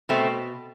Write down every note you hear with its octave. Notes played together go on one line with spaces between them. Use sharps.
B2 A3 C4